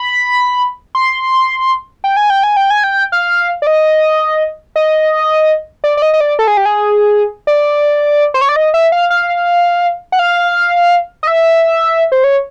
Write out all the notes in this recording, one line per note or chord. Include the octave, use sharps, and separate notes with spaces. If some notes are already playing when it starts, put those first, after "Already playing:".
Already playing: B5
C6
G5
G#5
G5
G#5
G5
G#5
G5
F5
D5
D#5
D#5
D5
D5
D#5
D#5
D5
A4
G#4
G4
G#4
D5
C5
C#5
D5
D#5
E5
F5
F5
F#5
F5
D#5
E5
C5
C#5